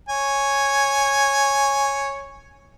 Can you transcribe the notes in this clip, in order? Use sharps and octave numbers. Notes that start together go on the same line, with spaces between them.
C#5 G#5